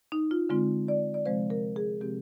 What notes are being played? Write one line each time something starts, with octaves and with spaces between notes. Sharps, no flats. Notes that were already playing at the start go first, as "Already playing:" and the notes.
D#4
F4
D3 G#3 C4 F4
D5
D5
C3 F3 G#3 C4 C5
A#4
G#4
C3 F3 G#3 C4 G4